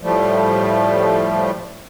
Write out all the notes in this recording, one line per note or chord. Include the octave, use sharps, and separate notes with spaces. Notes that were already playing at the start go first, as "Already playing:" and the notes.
A2 F3 G3 A3